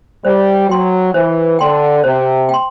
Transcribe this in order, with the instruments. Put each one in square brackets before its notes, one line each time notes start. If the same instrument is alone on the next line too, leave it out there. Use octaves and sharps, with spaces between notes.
[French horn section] G3 [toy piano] C5
[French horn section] F#3 [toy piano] G5 C6
[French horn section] E3 [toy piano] C5
[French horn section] D3 [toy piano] G5 C6
[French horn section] C3 [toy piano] C5
[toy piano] G5 C6